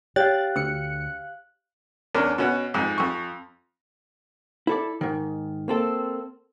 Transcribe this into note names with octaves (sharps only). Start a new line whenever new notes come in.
G4 C#5 F5 F#6 A6
D2 E6 C#7
E2 C#4 D4 A#4
B2 C#4 F#5
F2 G#2
F2 C#6
E4 A4 D5
G#2 D#3
A#3 C4 A4